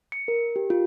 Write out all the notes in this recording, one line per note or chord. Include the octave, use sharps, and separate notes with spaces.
C#7
A#4
G4
F4